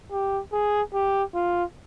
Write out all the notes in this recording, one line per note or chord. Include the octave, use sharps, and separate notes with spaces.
G4
G#4
G4
F4